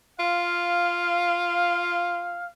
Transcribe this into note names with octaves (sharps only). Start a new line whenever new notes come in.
F4 F5